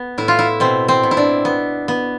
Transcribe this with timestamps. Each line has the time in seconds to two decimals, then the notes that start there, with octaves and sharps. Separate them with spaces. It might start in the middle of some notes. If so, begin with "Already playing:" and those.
Already playing: B3
0.18 A2 E4
0.28 F4
0.39 E4
0.60 B2 C4
0.88 C4
1.03 B2
1.11 E4
1.17 D4
1.45 B3
1.88 B3